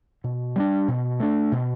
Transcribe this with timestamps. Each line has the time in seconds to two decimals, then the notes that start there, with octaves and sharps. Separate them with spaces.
0.24 B2
0.56 G3 B3 D4
0.88 B2
1.20 A3 D4
1.52 B2